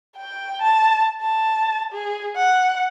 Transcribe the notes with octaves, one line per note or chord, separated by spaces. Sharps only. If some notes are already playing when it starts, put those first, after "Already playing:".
G5
A5
A5
G#4
F#5